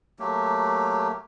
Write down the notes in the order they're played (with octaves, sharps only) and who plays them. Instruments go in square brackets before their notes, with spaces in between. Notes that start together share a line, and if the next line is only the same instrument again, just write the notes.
[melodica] F#3 A3 A#3 G4